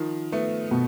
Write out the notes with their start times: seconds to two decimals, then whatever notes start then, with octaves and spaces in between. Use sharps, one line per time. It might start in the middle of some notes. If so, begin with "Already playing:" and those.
Already playing: D#3 F3
0.32 A3 B3
0.71 B2